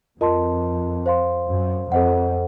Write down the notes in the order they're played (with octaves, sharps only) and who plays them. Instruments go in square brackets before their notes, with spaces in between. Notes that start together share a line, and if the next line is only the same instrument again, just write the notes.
[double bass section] F2 [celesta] F4 A#4 D#5 A5 C6
[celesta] C5 F5 C6
[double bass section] F#2
[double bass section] F2 [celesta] A4 C5 D#5 F#5